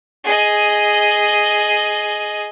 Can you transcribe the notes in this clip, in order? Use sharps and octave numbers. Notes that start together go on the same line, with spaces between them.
G#4 D#5